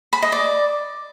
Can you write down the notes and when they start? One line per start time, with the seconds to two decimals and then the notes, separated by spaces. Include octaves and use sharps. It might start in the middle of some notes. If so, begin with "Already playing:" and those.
0.13 B5
0.22 D#5
0.32 D5